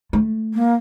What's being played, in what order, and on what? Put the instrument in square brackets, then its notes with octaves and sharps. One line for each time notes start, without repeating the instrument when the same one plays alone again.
[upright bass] A3
[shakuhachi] A#3